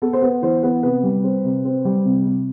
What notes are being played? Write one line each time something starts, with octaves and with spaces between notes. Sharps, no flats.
B3 A4
C5
B3 B4
E3 C5
B3 B4
C3 B4
G3
C4
C3
C4
G3
C3
C3